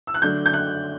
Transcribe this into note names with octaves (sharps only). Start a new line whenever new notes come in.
E6
F#6
D3 F#3 A3 D4 G6
G6
F#6